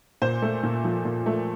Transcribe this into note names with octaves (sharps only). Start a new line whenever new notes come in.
A#2 C5
A3
A#2
F3
A#2
A3